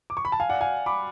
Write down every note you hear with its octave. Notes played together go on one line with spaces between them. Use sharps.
D6
C#6
B5
A5
F5 G#5
D5 F#5
F5 G#5
B5 D6